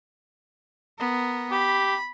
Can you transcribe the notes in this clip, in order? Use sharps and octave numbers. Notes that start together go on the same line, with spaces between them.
B3 A#4
G4 B5